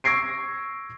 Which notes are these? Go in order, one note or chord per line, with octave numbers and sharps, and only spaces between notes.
C#6 E6 G#6 A#6 C7 D7